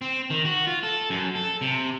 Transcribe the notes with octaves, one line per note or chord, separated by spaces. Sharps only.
C4
D#3
F#4
F4
A4
F#2
A4
C3